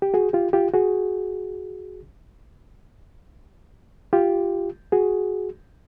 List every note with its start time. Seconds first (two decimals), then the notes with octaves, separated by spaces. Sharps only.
0.02 G4
0.14 F#4 G#4
0.33 F4 G4
0.53 F4 G4
0.74 F#4 G#4
4.13 F4 G4
4.92 F#4 G#4